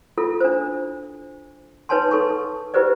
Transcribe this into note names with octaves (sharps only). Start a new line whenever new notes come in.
E4 F4 A4
D4 C5
D#4 B4 C#5 G#5 A5 C6
D#4 A4 C6 C#6
E4 G4 B4 C5 D5